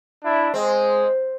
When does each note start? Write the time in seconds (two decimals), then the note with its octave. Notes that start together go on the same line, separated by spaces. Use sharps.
0.24 D4 E4
0.54 G#3 C4